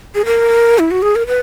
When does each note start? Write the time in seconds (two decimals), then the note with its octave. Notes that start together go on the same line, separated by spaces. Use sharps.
0.15 G#4
0.26 A#4
0.79 E4
0.91 F#4
1.02 G#4
1.16 A#4
1.27 B4